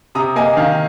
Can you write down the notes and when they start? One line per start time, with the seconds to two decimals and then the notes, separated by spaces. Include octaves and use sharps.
0.15 C3 A#5 D#6
0.36 A#3 D#5 G#5
0.57 D#3 F5